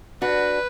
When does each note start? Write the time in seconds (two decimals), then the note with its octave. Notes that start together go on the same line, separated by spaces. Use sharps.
0.22 D4 F#4 B4